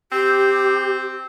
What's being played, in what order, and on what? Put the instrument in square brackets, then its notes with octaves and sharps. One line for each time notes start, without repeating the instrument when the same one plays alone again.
[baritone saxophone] C4 [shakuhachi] G4